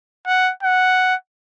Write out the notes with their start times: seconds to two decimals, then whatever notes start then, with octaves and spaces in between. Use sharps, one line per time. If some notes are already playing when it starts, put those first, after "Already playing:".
0.26 F#5
0.63 F#5